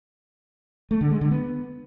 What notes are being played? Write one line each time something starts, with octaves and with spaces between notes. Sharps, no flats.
A3
D3
G#3
D3
B3